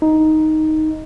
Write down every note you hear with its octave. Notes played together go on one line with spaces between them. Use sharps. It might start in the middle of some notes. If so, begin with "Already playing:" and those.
D#4